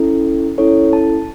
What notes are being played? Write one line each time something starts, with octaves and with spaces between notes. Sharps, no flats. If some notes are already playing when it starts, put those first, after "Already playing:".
Already playing: C#4 E4 A4
C#4 E4 A4 C#5
A5